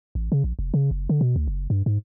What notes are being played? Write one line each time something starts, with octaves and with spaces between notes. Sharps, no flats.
A1
C#3
A#1
F1
C#3
F#1
D3
B2
D2
F#1
G2
G#2